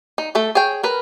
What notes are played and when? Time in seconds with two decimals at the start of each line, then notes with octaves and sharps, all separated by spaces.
0.18 D#4
0.35 A3 A4 E5
0.55 G#4 C#5 G5
0.83 A#4 B4